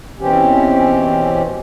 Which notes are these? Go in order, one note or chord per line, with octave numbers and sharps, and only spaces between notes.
B2 E3 C4 C#4 G4